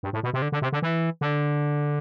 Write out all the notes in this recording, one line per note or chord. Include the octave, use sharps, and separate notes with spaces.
G2
A2
B2
C3
D3
D3
C3
D3
E3
D3